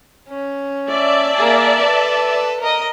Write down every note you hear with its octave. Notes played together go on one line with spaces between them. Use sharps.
C#4
D5 E5 A5
A#3 G#4
A4 B4
A#4 D#5